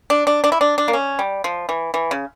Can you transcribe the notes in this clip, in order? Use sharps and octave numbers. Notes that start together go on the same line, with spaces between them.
D4
D4
D4
E4
D4
D4
A#3
C#4
G3
F3
E3
E3
C#3